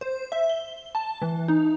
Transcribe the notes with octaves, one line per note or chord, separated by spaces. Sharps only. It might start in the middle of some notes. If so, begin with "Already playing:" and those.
C5
E5
G7
A5
E3
D#4